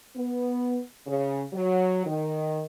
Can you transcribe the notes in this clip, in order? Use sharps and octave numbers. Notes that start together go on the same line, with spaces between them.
B3
C#3
F#3
D#3